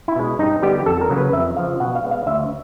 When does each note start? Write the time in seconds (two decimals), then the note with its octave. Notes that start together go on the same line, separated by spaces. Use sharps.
0.08 E4
0.16 B2 G#3
0.39 G2 D#4
0.63 D3 G3 B3 G4
0.86 F2 A4
1.01 A#4
1.10 C#3 F#3 A#3
1.18 B4
1.33 F2 E5
1.56 C#3 F3 F5
1.80 B2 F#5
1.95 F5
2.03 G#3 B3
2.11 F5
2.27 D2 E5